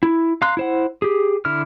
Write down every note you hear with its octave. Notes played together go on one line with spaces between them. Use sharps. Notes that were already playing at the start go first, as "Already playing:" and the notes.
E4
F5 A#5 C6 F#6
E4 C5 F#5
G4 G#4
D3 E4 F6